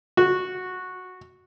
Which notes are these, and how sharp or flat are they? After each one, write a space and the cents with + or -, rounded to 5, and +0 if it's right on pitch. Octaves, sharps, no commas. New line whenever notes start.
F#4 -10